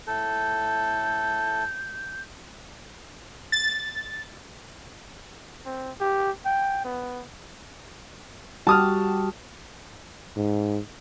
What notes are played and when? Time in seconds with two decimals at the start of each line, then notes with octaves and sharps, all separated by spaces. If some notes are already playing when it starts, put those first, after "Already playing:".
0.07 A2 A4 G6
3.52 A6
5.65 C4
6.00 G4
6.45 G5
6.85 B3
8.67 G3 F#4 G4 A5 D#6 F6
10.36 G#2